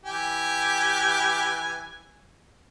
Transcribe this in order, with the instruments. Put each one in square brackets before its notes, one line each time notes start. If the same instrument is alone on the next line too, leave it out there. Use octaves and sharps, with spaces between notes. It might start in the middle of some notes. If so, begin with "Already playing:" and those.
[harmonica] E3 G4 G#5